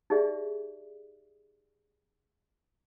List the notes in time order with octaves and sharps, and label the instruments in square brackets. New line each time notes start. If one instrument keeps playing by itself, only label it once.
[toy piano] D#4 G4 G#4 D5 E5